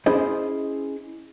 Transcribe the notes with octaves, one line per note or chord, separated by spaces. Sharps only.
C#4 E4 G#4 C5 D#5